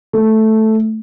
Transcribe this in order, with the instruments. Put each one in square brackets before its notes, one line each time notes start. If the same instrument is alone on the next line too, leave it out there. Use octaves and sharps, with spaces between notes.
[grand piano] A3